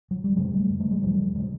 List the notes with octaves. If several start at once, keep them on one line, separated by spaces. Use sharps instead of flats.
F#3
G3
F#2 C#3 F#3 G#3
G3 A3
F#2 C#3
G3 A3
F#3 G#3
D#2 C#3 F3 G3
C#3 F#3 G#3